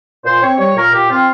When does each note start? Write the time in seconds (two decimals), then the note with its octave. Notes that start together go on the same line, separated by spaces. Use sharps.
0.24 A#2 C5
0.41 C4 C#5
0.58 G3 C#5
0.76 A#2 A#4
0.93 A#2 G4
1.10 C4 F4